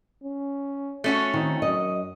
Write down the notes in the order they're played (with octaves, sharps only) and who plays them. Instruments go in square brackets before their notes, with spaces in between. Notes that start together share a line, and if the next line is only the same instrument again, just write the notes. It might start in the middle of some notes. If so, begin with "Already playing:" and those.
[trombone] C#4
[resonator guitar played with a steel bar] A3 C#4 F#4
[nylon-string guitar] D#3 [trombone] C4
[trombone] F#2 [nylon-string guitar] D#5